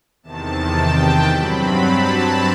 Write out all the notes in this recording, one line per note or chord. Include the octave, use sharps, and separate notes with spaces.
E2 C3 D#3 A5
G5
G2 F#3 C4 B5
A5